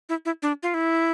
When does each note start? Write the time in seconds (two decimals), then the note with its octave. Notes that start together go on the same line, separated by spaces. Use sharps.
0.09 E4
0.25 E4
0.42 D4
0.63 F4
0.74 E4